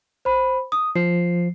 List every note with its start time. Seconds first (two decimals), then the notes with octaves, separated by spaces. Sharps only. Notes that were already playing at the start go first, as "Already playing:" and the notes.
0.25 C5 B5
0.72 D#6
0.96 F3 C7